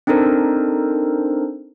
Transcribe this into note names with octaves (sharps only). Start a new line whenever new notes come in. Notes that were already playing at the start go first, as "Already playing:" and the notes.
C4 D4 D#4 A4 A#4 C5